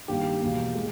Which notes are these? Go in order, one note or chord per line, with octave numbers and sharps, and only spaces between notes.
G2 D#3 A#3 G4
E2 B2 A#3
G#3